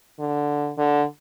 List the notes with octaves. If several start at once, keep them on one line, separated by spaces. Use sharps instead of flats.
D3
D3